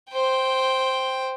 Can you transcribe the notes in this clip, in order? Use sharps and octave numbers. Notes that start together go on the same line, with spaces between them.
C5 G5